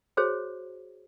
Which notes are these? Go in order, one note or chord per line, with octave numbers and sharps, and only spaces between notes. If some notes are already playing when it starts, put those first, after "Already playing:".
F#4 G#4 C5 C#5